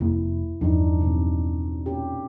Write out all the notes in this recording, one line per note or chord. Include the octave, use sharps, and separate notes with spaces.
F1 F2 A#3 E4
E2 G2 F3 D4 D#4
B2 C4
A#2 C#4 G4